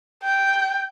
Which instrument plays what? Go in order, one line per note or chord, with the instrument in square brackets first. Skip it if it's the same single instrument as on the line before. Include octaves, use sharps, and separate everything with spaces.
[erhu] G5